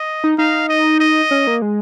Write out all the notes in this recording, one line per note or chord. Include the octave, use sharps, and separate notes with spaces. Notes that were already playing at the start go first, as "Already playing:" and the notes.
Already playing: D#5
D#4
D#4 F5
D#5
D#5
C#4
A#3
G#3